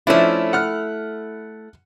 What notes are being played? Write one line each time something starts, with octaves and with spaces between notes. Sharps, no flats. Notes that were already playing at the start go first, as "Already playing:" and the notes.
F3 A3 C#4 D4 E4
F#5 F6 F#6